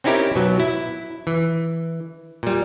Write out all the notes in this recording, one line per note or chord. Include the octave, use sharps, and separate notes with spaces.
C4 C#4 D#4 E4 G4 A#4
B2 F#3
E4
E3
A#2 G3